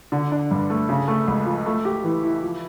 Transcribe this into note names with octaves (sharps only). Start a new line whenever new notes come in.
D3
D4
G2
A3
C#3
A3
C#2
F3
A3
G4
E3
E4
F3